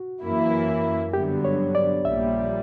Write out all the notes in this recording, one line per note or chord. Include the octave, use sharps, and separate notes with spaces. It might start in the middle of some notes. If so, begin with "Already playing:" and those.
Already playing: F#4
F#2 E3 A#3 E4
G2 D3 F#3 B3 G4
C#5
D5
A#1 A#2 G3 E5